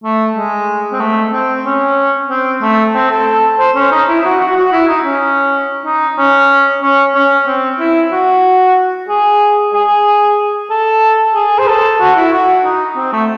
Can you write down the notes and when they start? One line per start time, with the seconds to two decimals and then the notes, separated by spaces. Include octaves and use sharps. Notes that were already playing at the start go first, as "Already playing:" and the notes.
0.04 A3
0.36 G#3
0.92 C4
1.00 A3
1.33 C4
1.65 C#4
2.30 C4
2.62 A3
2.95 C4
3.11 A4
3.59 C5
3.75 C#4
3.91 D#4
4.08 E4
4.20 E4
4.24 F#4
4.40 F#4
4.56 F#4
4.72 E4
4.88 D#4
5.04 C#4
5.85 D#4
6.18 C#4
6.82 C#4
7.15 C#4
7.46 C4
7.79 E4
8.12 F#4
9.08 G#4
9.73 G#4
10.70 A4
11.34 G#4
11.58 C5
11.67 A4
12.00 F#4
12.16 E4
12.32 F#4
12.64 D#4
12.96 C4
13.12 A3